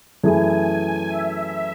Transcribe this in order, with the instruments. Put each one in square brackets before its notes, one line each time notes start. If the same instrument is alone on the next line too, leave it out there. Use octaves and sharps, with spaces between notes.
[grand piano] F#2 E3 A3 E4 G#4 [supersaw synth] G#5
[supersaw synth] E5